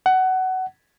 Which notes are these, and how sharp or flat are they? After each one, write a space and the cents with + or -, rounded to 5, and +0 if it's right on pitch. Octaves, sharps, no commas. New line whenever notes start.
F#5 +20